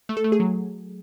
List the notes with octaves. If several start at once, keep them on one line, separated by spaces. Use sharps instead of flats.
A3
A4
A3
G#4
F#3